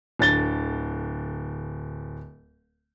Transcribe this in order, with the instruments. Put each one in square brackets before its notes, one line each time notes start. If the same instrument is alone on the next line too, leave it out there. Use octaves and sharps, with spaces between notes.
[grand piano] D1 D3 A6 G7